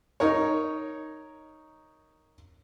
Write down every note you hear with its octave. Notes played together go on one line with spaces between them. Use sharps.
D#4 A#4 C#5